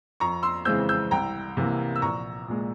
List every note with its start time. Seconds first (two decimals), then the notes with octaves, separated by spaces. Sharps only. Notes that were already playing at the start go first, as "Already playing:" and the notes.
0.20 F2 A#5 C#6
0.43 C6 E6
0.65 C#3 E3 G#3 C4 E6 G6
0.89 E6 G6
1.11 C2 G5 A#5
1.57 C3 E3 A#3
1.96 E6
2.02 A#1 A#5 C#6
2.48 A#2 G#3